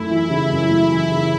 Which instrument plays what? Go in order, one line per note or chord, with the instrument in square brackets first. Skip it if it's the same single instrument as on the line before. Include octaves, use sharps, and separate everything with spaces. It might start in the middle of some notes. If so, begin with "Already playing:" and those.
Already playing: [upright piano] F#2 A3 [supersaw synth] E4
[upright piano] E3
C#3
F#2
A3
E3
C#3